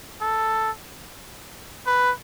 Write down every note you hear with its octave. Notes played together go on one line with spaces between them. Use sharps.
A4
B4